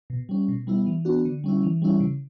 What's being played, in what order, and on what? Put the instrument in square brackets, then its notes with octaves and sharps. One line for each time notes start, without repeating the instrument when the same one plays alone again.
[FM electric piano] B2
G3 C#4
B2
G3 B3 E4
E3
B3 D4 F#4
D3
G3 C#4 E4
E3
G3 C#4 E4
C#3